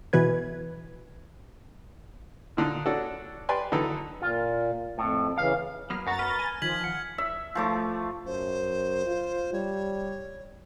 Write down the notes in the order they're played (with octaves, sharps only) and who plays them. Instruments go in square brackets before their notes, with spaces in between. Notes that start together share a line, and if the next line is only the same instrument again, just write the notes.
[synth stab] B2 E3 B4 G#6
[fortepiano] A#2 D3 D#4
C#4 D4 F#4 A4
G4 B4 D5 G#5 C6
D3 E3 F#3 D#4 A4 B4
[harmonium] A#2 [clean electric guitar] F4
[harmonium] F2 [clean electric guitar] A2
[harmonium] C#3 E3 [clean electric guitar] F5
[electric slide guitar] F#3 A#3 B3 [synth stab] F6
[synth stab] F#2 F#4 [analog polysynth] A#5 A6
[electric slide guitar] B4 [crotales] F6
[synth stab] G#5
[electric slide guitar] D#3 [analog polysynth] F3 [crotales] G#6 B6 F#7
[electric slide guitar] F#5
[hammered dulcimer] E5
F3 A3 D6
[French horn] F#2 [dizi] C5
[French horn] F4
[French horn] G3 [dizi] C#5